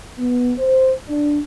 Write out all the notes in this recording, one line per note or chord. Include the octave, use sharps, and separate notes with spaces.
B3
C5
D4